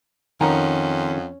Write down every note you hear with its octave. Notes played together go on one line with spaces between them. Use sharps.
F2 D#3 C#4 F#5 G#5 A#5